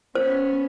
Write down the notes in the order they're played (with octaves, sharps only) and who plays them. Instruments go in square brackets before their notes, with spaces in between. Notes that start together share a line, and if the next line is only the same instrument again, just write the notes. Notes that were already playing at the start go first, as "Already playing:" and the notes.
[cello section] B3 C#4 [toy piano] C5